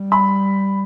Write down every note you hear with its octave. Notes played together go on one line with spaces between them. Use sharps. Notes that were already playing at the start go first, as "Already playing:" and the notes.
Already playing: G3
B5